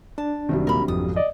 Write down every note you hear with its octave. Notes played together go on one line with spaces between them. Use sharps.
D4 A5
F#1 C3 D#3 F#3 G3
D#2 A#2 A#4 B5
G#1 F2 F3 D#6
D5 D#5